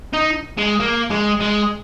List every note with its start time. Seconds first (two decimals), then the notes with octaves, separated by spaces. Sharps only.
0.13 D#4
0.57 G#3
0.80 A#3
1.10 G#3
1.40 G#3